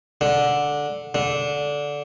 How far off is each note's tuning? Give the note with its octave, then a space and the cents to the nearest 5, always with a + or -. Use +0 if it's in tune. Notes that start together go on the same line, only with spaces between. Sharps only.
D3 -5
D3 -15